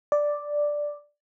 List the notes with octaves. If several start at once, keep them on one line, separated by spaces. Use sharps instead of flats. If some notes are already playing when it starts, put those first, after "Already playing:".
D5